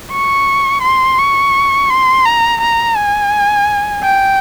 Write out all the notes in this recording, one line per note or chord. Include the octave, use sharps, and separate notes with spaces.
C#6
C6
C#6
C6
A#5
A#5
G#5
G5